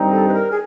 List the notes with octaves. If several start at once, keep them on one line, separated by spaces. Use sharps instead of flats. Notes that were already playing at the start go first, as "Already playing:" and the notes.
Already playing: G2 D#3 G3 C4 D#4
A4
B4
A#4
G#4